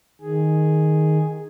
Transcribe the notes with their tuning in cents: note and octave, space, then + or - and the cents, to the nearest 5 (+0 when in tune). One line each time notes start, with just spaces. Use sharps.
D#3 +0 G#4 +0